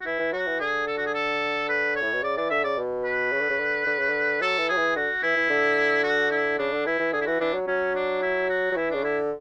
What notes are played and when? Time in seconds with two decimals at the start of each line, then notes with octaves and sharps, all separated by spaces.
0.01 F#4
0.06 E3 E4
0.19 E3
0.33 F#3 F#4
0.47 E3
0.60 D3 G#4
0.87 A4
0.98 F#4
1.06 G#4
1.14 A4
1.69 B4
1.96 C#5
2.03 A2
2.13 B2
2.23 C#3 D5
2.37 E3 D5
2.50 D3 E5
2.64 C#3 D5
2.78 B2
3.04 B4
3.32 C#3
3.41 D3
3.50 C#3
3.59 D3
3.87 D3
3.98 C#3
4.09 D3
4.41 F#3 A4
4.59 E3
4.69 F#3 G#4
4.77 E3
4.96 D3 F#4
5.23 E3 E4
5.36 E3
5.49 D3
6.04 F#4
6.31 E4
6.59 C#3 D4
6.73 D3
6.86 E3 E4
7.00 E3
7.13 D3 G#4
7.21 E4
7.26 E3 F#4
7.41 E3 D4
7.54 F#3
7.67 F#3 C#4
7.95 D4
8.22 E4
8.49 F#4
8.72 F#3
8.76 E3 E4
8.91 C#3 D4
9.03 D3 E4